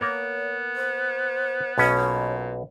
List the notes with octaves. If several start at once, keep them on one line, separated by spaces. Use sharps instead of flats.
A#3 B3 A#4 C#5
C5
B1 B2 C#4 C#5
A#2